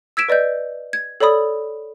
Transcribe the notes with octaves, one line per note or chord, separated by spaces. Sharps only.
E6 G#6 B6 D7 E7
B4 D5 D#5 G6
G#6
A4 C#5 D5 B5 D#6